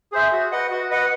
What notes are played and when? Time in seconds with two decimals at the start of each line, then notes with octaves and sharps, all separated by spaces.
0.12 G#4 C5 E5
0.32 F#4
0.51 B4 D#5 F#5
0.71 F#4
0.90 B4 D#5 F#5